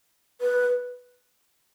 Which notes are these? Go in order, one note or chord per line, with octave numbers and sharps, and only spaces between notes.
B4